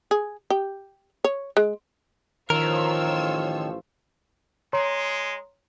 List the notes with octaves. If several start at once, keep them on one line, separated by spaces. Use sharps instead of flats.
G#4
G4
C#5
G#3
A1 D#3 F3 F4 A#4 C#5 E6
G#3 C#5 A#5 C6